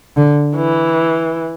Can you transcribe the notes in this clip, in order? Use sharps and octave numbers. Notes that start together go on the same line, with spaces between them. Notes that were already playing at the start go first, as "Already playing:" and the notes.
D3
E3